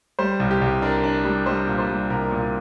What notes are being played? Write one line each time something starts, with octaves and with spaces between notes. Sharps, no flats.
G3 C5
C2
G4
C2
D4 A#4
D4
G3
G3 C5
A#2
C5
G3
C2 A#4
A#2